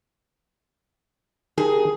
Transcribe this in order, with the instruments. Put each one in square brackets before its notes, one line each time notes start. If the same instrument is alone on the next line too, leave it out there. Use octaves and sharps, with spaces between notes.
[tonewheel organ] D#3 G4 A#4 [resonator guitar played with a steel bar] G#4